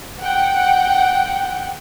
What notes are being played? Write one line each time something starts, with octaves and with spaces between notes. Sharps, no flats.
F#5 G5